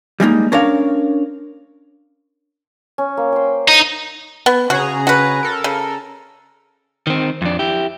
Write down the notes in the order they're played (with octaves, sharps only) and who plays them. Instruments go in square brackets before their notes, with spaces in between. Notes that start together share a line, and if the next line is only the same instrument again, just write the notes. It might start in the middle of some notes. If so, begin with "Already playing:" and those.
[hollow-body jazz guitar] G3 G#3 A#3 D#4
C#4 D4 A#4 C#5 F5
[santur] C#4
A#3
C5 G5
[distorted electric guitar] D#4
[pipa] B3
[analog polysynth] C#3 G#4 A#5 [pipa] F#4
[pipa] F#4 B4
[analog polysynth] A4 A#4
[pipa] C#3
[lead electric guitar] D#3 C4
F2 D4
E4 G4